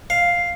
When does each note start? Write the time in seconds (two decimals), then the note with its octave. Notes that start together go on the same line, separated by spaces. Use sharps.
0.10 F5